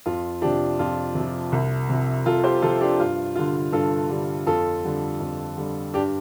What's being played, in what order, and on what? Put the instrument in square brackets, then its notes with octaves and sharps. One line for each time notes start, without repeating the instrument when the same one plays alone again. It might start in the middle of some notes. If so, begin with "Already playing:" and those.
[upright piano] F2 F4
C3 F3 D4 G4
F2 F4
C3 F3
C2
C3 F3
C2 F4 A4
G4 C5
C3 F3 F4 A4
D4 G4
G2 F4
D3 G3 F4
G2 F4 A4
D3 G3
F2 F4 A4
D3 G3
F2
D3 G3
G2 D4 G4